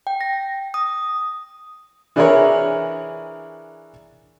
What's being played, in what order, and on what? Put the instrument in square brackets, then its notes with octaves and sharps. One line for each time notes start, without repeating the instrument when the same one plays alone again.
[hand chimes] G5
A#6
D#6
[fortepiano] E3 D4 E4 G#4 A#4 C#5